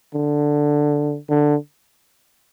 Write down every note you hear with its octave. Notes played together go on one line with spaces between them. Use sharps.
D3
D3